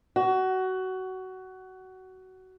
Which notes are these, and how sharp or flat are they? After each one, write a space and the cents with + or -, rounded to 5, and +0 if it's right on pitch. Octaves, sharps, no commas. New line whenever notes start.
F#4 +20